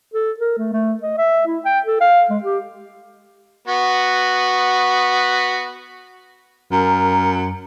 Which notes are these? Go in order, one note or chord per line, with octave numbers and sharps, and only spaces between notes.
A4
A#4
A3
A3
D#5
E5
E4
G5
A4
F5
G#3
G4
B3 F#4
F#2 A#4